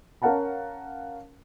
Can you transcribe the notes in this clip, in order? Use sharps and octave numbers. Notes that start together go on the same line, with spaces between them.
C#4 A#4 F5 F#5 A5 A#5